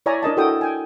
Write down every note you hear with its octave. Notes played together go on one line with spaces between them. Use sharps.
E4 C#5 D5 E5 G#5 A#5
D4 A#4 D#5 A5
E4 F#4 A4 A#4 G5 D#6
G5 G#5